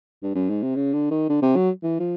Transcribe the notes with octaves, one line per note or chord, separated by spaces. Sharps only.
G2
F#2
G#2
C3
C#3
D3
D#3
D3
C3
F#3
E3
F3